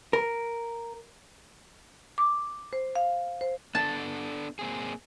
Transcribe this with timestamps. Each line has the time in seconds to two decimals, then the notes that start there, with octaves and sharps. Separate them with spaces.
0.13 A#4
2.18 D6
2.73 C5
2.96 F5
3.41 C5
3.75 B3 D4 A4 A5
4.59 A#3 C4 G#4